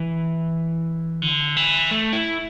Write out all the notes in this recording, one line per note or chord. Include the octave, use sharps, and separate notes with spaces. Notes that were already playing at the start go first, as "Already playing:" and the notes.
Already playing: E3
D3
E3
A3
E4